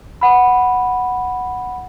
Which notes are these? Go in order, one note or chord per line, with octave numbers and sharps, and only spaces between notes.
F#5 B5